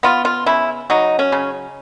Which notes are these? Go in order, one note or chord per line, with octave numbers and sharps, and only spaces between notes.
B3 F4
F4
C#3 E4
F#3 D#4
C#4
C#3